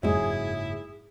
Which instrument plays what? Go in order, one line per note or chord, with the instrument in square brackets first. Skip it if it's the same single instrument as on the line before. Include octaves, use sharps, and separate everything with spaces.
[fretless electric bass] F#1 G#2 F#3 [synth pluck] F2 G#3 [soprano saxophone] E4 [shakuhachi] G#4